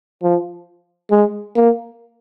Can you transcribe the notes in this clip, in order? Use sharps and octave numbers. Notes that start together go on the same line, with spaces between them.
F3
G#3
A#3